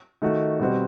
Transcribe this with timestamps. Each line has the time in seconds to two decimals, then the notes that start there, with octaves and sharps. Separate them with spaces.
0.22 D#3 A3 D#4 F#4
0.60 B2 G3 C4 F#4